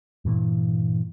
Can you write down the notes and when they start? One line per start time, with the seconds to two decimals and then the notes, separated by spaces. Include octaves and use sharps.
0.25 G2 A#2 E3